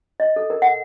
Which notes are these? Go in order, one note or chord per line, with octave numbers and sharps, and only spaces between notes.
D#5
A4
A#4
F#5